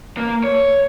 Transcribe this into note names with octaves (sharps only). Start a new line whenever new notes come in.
A#3
C#5